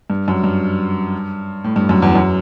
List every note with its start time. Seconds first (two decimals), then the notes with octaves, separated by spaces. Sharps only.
0.10 G2
0.28 F#2
0.44 G2
1.64 A2
1.76 G2
1.89 F#2
2.02 E2
2.15 F#2